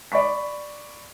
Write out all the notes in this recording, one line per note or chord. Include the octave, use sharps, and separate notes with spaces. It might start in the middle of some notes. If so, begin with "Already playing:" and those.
D5 B5 C#6 B6